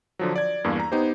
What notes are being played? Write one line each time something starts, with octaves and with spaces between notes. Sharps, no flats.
D3 F3 F#3
D5 G#6
E2 G2 A#3
A#5
B3 D#4 G4 C5